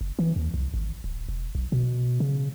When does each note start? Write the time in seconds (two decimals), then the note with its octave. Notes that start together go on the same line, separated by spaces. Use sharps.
0.01 F#1
0.19 E3
0.36 D#2
0.54 C2
0.74 G#1
1.04 D1
1.29 E1
1.55 B1
1.72 B2
2.20 C#3